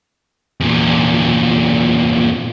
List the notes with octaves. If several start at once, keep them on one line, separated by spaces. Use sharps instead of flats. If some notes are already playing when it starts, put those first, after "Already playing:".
E2 A#2